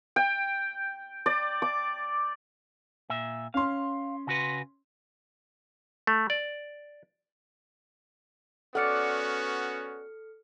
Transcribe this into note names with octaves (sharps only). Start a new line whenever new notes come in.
G5
D5
D6
A#2 E5
C#4 F5 C6
C#3 F#4 B4
A3
D5
B3 C#4 F#4 A4 D5 F#5 F6 C#7